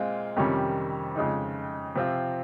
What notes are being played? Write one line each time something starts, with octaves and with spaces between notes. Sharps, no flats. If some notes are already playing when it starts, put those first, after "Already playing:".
Already playing: A#2 G#3 C4 F4
F2 C3 D#3 G3 C#4
F2 C#3 G#3 D#4
C3 F3 C4 F4